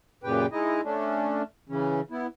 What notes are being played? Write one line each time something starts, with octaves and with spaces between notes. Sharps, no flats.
F#2 A#2 C#3 G4 B4 G5
G#3 D#4 E4 D#5
A3 C#4 D4
C#3 E3 C#4
B3 E4